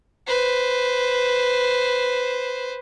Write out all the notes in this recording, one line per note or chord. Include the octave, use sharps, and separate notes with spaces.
B4 C5